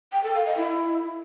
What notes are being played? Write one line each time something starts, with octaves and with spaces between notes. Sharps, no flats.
G5
A4
F5
D#5
E4